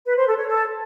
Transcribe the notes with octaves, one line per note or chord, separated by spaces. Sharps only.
B4
C5
A4
C#5
A4